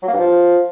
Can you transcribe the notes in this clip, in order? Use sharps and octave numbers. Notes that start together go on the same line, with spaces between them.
F#3
A#3
G2
F3